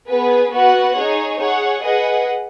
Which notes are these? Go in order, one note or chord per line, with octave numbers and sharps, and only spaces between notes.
B3 G#4 B4
B3 F#4 B4 F#5
D#4 G#4 C#5
G#4 C#5 F#5
G#4 B4 D#5 F#5